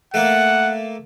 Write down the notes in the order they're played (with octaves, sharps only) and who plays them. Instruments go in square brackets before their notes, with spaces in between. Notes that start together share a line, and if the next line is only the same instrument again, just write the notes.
[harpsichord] A3 A#3 [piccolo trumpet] F#5